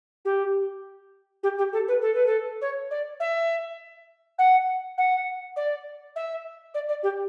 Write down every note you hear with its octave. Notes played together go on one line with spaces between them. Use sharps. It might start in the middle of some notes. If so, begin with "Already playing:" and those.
G4
G4
G4
A4
B4
A4
B4
A4
C#5
D5
E5
F#5
F#5
D5
E5
D5
D5
G4